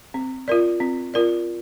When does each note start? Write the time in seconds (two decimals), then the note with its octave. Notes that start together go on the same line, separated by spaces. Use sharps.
0.14 C4
0.48 F4 A#4 D5
0.80 C4
1.14 F4 A#4 D5